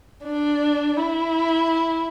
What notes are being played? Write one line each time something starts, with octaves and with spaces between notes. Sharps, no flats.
D4
E4